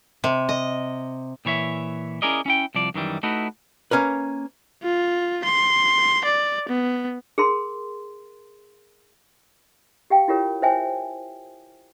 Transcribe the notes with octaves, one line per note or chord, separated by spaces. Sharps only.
C3
D#5
A#2 E3 C#5 E5
C#4 E4 G#4 A#4 D5 D#5
C#4 E4 G5
C2 F3 D5
F#2 D#3 E3 G3
A3 D#4 E4 F#4 B4
A#3 C#4 A#4 B4
F4
C6
D5
B3
G#4 A#4 C6
G4 F5 G5
E4 F4 G4 A#4 C#5
C5 C#5 E5 G5 G#5